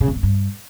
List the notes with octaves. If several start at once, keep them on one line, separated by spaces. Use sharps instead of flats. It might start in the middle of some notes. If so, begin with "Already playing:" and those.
C#3
E2
G#2
G2